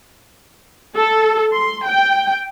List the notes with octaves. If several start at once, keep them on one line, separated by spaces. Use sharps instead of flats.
A4
C6
G5